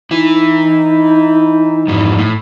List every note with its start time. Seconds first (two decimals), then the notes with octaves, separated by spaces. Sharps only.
0.11 E3 D#4 E4
1.88 F2 G#2 E3
2.19 A2